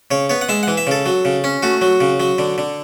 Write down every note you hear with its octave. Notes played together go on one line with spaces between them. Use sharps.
C#3 C#5
B3 C#5
F#5
G#3 E5
E3 F#5
E5
C#3 A4
F#3
C#3
C#4
A3 F#4
F#3
C#3
F#3
D3
D3